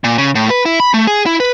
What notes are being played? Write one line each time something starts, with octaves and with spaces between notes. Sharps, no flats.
A#2
C#3
A2
B4
E4
B5
A3
G#4
E4
B4